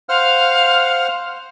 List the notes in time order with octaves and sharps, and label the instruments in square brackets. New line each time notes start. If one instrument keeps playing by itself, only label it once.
[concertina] C5 F#5 F6 [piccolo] F5